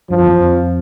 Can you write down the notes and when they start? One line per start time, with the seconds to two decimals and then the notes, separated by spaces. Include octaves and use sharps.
0.10 G2 F3
0.19 F2
0.27 E2
0.36 F2